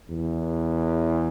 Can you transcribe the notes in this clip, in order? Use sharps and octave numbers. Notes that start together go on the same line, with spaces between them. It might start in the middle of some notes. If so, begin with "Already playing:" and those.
E2